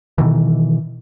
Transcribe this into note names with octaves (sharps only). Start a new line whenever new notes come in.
B2 D#3 E3